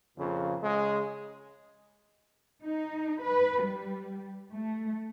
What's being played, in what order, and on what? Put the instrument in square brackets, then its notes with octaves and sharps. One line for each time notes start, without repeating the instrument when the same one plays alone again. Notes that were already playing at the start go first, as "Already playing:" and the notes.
[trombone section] F2 A#2 C#3
C#3 G#3
[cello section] D#4
B4
G3
A3